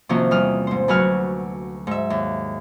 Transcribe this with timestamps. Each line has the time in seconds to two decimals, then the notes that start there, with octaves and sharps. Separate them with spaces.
0.09 C3 D#3 F3 A#3 C#4 F#4
0.31 E2 G3 D#6 F6
0.67 G#2 C5
0.88 D2 F#3 B4 F#5 G#5 F6
1.87 G#2 E5
2.10 D#2